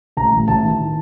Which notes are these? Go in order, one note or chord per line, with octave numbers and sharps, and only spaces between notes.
A1 A#5
A1
A1 A5
D#3
E3